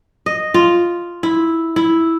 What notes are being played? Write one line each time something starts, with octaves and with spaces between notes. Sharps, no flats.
D#5
F4
E4
E4